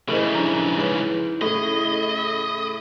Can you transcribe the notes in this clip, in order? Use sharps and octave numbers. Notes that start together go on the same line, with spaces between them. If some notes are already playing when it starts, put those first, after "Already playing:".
A2 C#3 E3 E4 G#4 A#4 C5 D#5
G2 F3 G3 D#4 A#5
G#2 C#4 B4 C#5 F#7
A2 C#3 A4 D#5